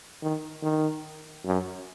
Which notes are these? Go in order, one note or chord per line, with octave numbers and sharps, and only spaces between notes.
D#3
D#3
F#2